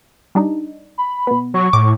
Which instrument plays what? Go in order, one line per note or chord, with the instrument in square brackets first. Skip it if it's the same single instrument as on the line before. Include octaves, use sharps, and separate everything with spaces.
[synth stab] G3 D4 D#4
[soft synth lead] B5
[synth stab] B2 B3
[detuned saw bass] F#3 [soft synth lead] C#6
[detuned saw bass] A2 [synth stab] D6